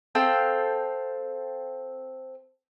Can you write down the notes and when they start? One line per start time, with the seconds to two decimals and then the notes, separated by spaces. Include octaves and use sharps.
0.15 C4 A4 F5 G5